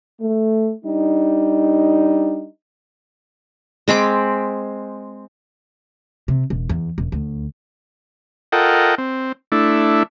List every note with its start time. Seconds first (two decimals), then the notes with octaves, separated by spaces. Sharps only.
0.19 A3
0.84 G3 D4 D#4
3.88 G#3 C4 B5 D6
6.28 C3
6.50 E1
6.69 E2
6.98 E1
7.12 D2
8.52 F4 A4 A#4 D#5 F#5 G5
8.98 C4
9.52 A3 D4 E4